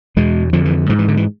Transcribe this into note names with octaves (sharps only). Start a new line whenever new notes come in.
E2 B2 G#3
F2 D3 F3
E3
G#2 F3
E3
D3
E3